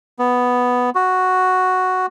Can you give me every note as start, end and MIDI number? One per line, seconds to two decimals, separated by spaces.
0.19 0.90 59
0.95 2.06 66